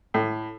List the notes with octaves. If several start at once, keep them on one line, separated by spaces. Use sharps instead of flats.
A2